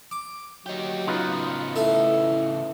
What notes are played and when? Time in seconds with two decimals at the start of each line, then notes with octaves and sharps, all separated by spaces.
0.11 D6
0.66 F#3 D#4 G4
1.07 C#3 B3 D#4 F4 B4
1.76 A3 E4 A4